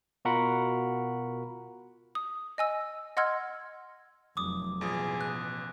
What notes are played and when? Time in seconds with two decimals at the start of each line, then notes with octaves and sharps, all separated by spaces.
0.25 B2 F4 F#4 A#4 F#5 B5
2.15 D#6
2.58 D#5 G#5 E6
3.17 D#5 F#5 C6 E6 F6 G#6
4.37 F1 F#3 D6 D#6
4.81 A1 B2 F3 G#4
5.21 F#6